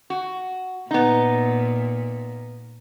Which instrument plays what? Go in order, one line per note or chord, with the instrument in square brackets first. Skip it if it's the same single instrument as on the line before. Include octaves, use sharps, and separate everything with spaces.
[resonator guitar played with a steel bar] F#4
[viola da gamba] A#2 [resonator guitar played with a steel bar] B3 D#4